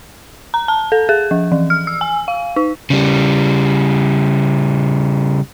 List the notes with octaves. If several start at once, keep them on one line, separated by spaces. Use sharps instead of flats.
A#5
A5
A4
G#4
F3
E3
F6
E6
G#5
F5
D#4
C#3 G3